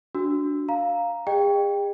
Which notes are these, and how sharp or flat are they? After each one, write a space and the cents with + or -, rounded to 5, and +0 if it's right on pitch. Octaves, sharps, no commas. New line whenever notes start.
D4 -10 F#4 +0 E6 +0
F5 +0 A#5 +0
G#4 -40 D#5 -40 G5 +10